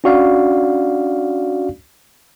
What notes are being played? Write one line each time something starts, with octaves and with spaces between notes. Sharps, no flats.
C#4 D4 F#4 D5 F5